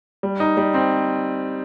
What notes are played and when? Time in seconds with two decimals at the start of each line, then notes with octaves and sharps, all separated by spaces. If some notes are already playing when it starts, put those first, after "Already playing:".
0.23 G3
0.40 D#4
0.57 G3
0.74 C4